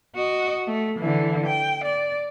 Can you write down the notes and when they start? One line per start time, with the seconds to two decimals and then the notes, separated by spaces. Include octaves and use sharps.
0.15 F#4 D#5
0.67 A3
0.98 D3 E3
1.46 G5
1.84 D5